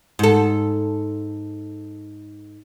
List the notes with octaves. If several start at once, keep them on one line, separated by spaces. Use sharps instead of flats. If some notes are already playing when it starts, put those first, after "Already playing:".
G#2 A4